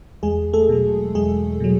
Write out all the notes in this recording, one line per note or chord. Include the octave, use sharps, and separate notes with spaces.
E2 G#3 G#4
A3 A4
B2 F#3
E2 G#3 G#4
B2 F#3